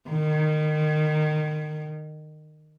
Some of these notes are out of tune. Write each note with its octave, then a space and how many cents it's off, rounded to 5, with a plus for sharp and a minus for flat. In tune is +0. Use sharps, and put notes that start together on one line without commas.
D#3 -25